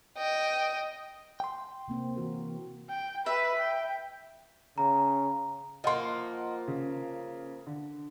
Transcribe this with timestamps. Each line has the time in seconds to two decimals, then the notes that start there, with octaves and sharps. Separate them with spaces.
0.18 D#5 G5
1.40 G5 C6
1.88 C3 A#3 C4
2.16 E3 F#4 A#4
2.89 G5
3.26 B4 E5
3.60 G5
4.78 C#3 A#5
5.84 F3 A#3 D#5 F#5 C6
6.68 C#3
7.67 D3